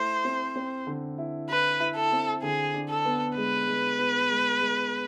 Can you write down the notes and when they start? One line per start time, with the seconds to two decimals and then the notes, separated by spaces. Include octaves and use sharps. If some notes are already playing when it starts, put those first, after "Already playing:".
Already playing: A3 E4 C5
0.25 C4
0.56 C4
0.87 D3
1.18 E4
1.49 E4 B4
1.80 E4
1.96 A4
2.12 C4
2.43 D3 G#4
2.74 D4
2.90 A4
3.05 B3
3.36 G#3 B4
3.68 G#3
3.99 B3
4.30 G#3
4.61 G#3